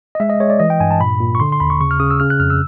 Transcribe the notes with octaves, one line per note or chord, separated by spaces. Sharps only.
D#5
G#3 E5
D#5
G#3 C#5
D5
E3 D#5
G5
G2 G#5
A5
A#2 B5
A#2
C#6
D3 C6
C6
D#2 B5
C#6
C#3 C#6
F6
C#3 D#6
E6
C#3 F6
F#6
F2 F6
E6